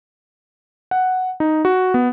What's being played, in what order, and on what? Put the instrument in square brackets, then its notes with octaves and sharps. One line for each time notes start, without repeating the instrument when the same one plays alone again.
[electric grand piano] F#5
D#4
F#4
B3